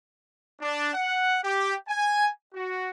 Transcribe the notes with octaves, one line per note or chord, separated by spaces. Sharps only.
D4
F#5
G4
G#5
F#4